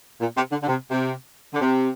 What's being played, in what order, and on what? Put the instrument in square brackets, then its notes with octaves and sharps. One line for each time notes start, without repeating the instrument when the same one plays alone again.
[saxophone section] A#2
C3
D3
D3
C3
C3
D3
C3